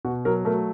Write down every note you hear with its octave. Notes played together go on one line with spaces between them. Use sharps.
B2 F#4
F#3 A#4
A3 A#4